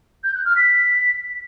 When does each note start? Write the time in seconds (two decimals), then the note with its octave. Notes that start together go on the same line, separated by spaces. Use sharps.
0.24 G6
0.34 F#6
0.45 F6
0.56 B6